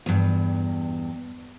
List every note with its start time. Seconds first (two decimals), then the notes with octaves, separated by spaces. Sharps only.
0.06 E2 G2